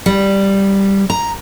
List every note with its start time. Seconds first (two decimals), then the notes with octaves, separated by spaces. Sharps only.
0.06 G3
1.10 A#5